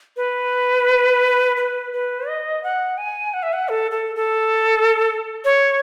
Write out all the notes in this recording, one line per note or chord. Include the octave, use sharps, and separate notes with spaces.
B4
B4
B4
D#5
F#5
G#5
F#5
E5
F#5
A4
A4
A4
C#5